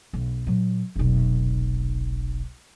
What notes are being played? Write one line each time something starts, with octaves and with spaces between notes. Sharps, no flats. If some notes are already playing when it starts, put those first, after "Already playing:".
B1
A#2 F#3
F1 B1